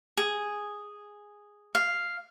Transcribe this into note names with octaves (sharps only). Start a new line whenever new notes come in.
G#4
F5